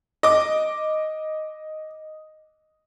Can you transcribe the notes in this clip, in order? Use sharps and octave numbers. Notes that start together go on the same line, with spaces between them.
D#5 D6